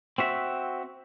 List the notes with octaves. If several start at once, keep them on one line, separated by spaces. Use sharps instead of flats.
C4 F#4 E5